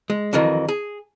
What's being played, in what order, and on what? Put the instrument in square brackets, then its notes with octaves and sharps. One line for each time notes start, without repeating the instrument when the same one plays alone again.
[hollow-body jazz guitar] G#3
F2 D#3 E3 F#3
G#4